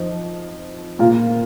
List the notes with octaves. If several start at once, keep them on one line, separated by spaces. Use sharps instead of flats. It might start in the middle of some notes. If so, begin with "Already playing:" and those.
Already playing: F2 F3 D#4
A#2 A#3 F4 A#4